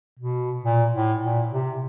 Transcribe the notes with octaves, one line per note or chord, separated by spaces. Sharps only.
B2
A#2
A2
A#2
C3